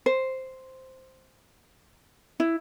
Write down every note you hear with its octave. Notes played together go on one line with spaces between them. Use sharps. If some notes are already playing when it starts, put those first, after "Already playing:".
C5
E4